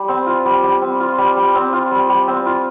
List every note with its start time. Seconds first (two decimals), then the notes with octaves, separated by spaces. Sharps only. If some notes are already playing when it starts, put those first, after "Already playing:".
Already playing: G3
0.08 C4
0.27 F4
0.45 G3
0.63 G3
0.82 C4
1.00 F4
1.18 G3
1.36 G3
1.55 C4
1.73 F4
1.91 G3
2.09 G3
2.28 C4
2.46 F4